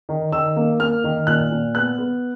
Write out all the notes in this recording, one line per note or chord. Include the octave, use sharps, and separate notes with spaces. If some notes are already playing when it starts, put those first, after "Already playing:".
D#3
D#3 E6
A#3
A#3 F6
D#3
A#2 F#6
A#2
B3 F#6
B3